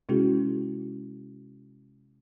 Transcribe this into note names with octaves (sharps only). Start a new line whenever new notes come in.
C3 G#3 C#4 E4 F#4 G#4